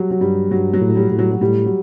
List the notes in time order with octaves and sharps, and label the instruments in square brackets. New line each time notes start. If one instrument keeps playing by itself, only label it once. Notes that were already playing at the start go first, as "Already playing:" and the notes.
Already playing: [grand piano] F#3 G3
F#3
[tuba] G2 [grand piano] G3
[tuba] G2 [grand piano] F#3
[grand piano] F#3
[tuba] A2
[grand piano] G3
[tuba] A2 [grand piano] G3
[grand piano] F#3
F#3
[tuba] A2 [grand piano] G3
[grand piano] F#3